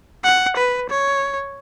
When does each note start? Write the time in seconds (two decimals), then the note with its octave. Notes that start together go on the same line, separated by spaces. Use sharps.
0.24 F#5
0.57 B4
0.90 C#5